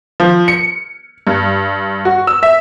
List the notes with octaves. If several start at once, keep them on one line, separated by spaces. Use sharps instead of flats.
F3
C#7
G2
F#4
E6
E5